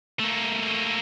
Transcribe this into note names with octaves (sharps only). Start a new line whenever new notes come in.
A3 A#3